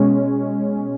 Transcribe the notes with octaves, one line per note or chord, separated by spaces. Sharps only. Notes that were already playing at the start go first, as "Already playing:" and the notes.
Already playing: B2 G#3 C#4